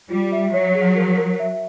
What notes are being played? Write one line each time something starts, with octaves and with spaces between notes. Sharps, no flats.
G3 F4
E5
F#3 C#5
G#4
A#4
A#4
E5